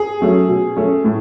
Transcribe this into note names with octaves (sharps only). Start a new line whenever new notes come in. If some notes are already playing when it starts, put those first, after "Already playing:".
Already playing: G#4
F#3 A3 C#4
B2
A3 C#4
A2